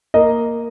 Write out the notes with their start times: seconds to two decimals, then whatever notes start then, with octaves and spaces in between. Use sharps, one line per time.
0.14 A#3 D#5